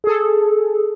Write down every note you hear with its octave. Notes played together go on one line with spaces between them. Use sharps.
G#4 A4